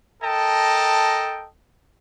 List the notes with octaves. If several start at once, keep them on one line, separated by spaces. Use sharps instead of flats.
A4 A#4 D#5 G5 A5